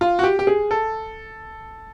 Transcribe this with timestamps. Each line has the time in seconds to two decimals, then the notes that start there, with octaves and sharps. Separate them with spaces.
0.01 F4
0.19 F#4
0.23 G4
0.39 G4
0.47 G#4
0.71 A4